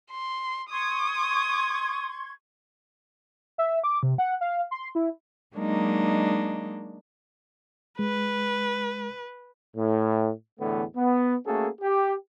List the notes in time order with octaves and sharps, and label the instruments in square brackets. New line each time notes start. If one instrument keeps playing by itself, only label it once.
[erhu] C6
[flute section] C6 C#6 G#6 [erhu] D#6
[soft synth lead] E5
D6
C3
F#5
F5
C6
E4
[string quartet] F#3 G#3 A#3 D4 D#4
[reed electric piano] G#3 [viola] B4
[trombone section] A2
E2 A2 D3 E3 A3 B3
B3
A3 A#3 C#4 F#4 G#4 A4
G4